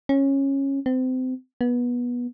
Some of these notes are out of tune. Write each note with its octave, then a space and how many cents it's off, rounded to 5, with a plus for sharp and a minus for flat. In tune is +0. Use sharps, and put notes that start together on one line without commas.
C#4 -15
C4 -30
B3 -20